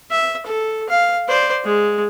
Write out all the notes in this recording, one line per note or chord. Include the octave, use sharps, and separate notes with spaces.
E5
A4
F5
C5 D5
G#3